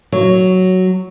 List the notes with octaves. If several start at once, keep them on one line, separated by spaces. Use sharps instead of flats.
F#3